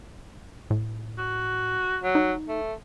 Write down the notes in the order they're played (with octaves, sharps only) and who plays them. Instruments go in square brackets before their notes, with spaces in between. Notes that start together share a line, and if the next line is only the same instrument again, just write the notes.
[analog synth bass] A2
[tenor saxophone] F#4
F#3
[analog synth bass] D#4
[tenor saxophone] A3